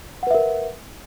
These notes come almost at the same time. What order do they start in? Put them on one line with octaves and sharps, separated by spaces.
F#5 B4 E5 A#4